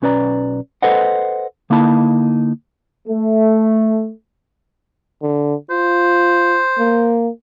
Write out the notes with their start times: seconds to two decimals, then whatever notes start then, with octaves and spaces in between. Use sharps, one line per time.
0.02 B1 C#4 B4 D5 A#5
0.82 A4 B4 C5 D#5 F#5
1.70 D3 A#3 D#4 E4 A5
3.08 A3
5.22 D3
5.70 F4 C5
6.79 A#3